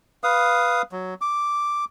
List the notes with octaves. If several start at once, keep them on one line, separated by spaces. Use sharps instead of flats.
B4 F5 D#6
F#3
D6